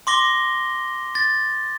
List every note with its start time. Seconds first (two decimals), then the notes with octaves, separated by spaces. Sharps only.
0.07 C6 D6 A#6 G7
1.15 A6